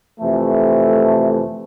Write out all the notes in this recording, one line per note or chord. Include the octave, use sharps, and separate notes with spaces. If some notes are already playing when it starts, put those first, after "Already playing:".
F2 C3 E3 A3